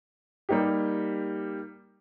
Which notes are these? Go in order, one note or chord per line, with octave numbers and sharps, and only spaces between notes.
G3 A#3 D#4 G4